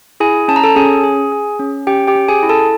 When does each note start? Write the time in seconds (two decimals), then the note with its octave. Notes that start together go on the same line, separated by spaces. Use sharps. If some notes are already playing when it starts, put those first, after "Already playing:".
0.20 E4 G#4 G#5
0.48 C#4 A5
0.56 A#5
0.64 A4 A5
0.76 C#4 G#4 G#5
1.04 G#4
1.32 G#4
1.59 C#4
1.87 C#4 G4 G5
2.07 G4 G5
2.15 C#4
2.28 G#4 G#5
2.43 E4
2.49 A4 A5